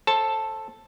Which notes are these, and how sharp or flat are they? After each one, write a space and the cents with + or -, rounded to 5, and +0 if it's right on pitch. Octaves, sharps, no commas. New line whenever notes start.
A4 +0 C5 +30 A5 +0